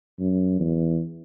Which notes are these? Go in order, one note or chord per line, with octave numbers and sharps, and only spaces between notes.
F#2
E2